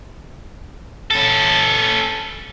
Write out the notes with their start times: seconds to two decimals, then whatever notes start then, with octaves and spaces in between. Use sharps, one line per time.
1.11 C#4 A4